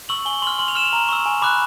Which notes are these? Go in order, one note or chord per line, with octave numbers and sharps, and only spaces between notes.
C#6 E6 F#7
G#5 G7
C6 F6 F#7
C6 F#7
F7
F6 E7
F7
A#5
C#6 E6
G#5
B5 D6 F#6